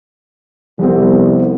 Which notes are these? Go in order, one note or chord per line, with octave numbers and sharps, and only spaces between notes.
C2 F2 B3 C4